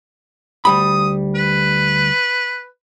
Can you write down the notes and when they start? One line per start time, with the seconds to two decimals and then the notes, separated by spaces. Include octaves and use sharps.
0.65 D2 G3 B5 D#6
1.35 B4